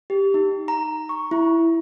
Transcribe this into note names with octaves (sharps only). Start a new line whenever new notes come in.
G4
D#4
A#5
C#6
E4